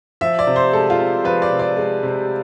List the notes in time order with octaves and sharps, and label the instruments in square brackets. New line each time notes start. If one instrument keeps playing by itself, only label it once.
[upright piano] F3 E5
D5
C3
C5
G#3 A4
F4
C3
F3 B4
D5
C3
D5
G#3
C3